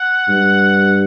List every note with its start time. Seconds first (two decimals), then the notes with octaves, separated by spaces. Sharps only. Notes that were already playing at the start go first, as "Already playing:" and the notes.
Already playing: F#5
0.29 G2